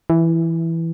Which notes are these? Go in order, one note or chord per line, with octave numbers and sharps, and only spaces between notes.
E3